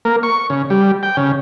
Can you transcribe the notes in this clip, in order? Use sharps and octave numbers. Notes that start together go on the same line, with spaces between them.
A#3
C#6
C#3
G3
G5
C#3